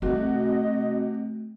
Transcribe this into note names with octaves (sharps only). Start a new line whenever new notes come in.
C3 A3 F#4 D#5